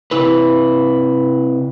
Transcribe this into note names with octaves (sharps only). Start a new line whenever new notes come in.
C3 E4 B4